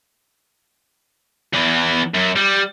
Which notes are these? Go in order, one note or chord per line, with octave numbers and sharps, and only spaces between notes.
E2 E3
F#2
G3